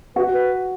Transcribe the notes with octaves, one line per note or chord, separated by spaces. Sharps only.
F#4 B4
B4